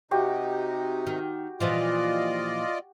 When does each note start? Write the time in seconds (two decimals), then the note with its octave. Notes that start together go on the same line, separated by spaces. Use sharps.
0.11 C3 D#4 F#4 G4 E5
1.07 D#3
1.60 A#2 E3 F3 F4 D5 D#5